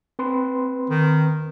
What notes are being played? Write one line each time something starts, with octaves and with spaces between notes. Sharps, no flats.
C4 B4 C6
D#3